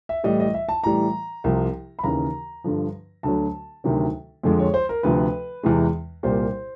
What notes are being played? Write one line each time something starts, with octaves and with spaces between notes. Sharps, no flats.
E5
A2 E3 G3 D#5
D#5
E5
A5
A2 E3 G3 A#5
C2 C3 F3
B5
D#2 C#3 E3 A#5
G2 D3 F3
D2 D3 F#3 A5
D2 C3 D#3 F#3
F2 D3 F3 G#3
C#5
C5
A#4
D2 C3 F3 B4
E2 C3 E3 G#3
C2 A#2 G3 C5